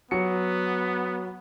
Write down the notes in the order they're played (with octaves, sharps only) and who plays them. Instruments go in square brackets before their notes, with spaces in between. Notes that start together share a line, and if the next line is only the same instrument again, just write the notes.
[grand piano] F#3 C#7 [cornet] B3